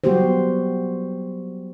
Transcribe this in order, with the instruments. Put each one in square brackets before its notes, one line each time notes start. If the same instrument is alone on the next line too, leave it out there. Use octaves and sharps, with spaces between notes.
[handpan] F#3 G3 B3 F#4 G4 C5